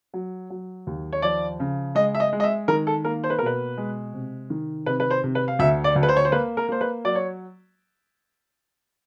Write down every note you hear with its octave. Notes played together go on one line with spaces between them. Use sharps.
F#3
F#3
D#2
C#5
F3 D5
C#3
G#3 D#5
E5
D#5
G#3
D#5
E5
D#3 A#4
A4
A#3 A#4
C5
B4
B2 A#4
B4
G#3
C3
D#3
C3 B4
B4
C5
C3
B4
F5
D2 E5
D5
D2
B4
C5
C#5
C5
A#3 B4
A#4
A#3 C5
B4
F#3 D5
C#5